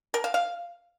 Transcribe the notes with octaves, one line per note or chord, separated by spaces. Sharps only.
A#4
F5
F5